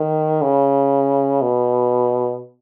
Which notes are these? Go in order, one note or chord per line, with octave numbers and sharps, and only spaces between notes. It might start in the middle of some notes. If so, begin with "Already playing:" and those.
Already playing: D#3
C#3
B2